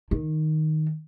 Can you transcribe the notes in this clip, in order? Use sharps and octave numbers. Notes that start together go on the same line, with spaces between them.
D#3